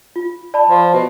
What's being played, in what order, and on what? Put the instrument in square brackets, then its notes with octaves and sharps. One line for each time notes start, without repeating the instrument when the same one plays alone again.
[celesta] F4
D5 A5 B5
[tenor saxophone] F3
B2